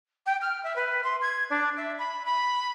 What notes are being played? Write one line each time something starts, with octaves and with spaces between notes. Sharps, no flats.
G5
F6
E5
B4
C6
G#6
D4
E5
B5
B5